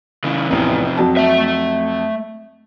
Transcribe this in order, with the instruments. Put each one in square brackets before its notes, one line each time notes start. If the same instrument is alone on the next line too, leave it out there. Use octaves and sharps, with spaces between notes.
[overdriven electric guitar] C#3 E3
[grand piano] A1 E2 [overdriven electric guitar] C3 F3
[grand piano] F2 F#3 A5
[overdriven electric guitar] A3 E5